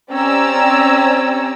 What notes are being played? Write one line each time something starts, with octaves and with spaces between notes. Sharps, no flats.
C4 C#4 G4 D5 A#5 E6